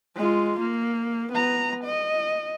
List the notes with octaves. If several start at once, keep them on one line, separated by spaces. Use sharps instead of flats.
G#3 F4
A#3
B3 A#5
D#5